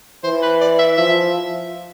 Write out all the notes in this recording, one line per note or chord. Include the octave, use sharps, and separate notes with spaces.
E3 C5
B4
D5
E5
F3 E5